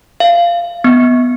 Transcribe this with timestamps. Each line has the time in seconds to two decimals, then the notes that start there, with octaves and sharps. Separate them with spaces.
0.20 F5
0.84 B3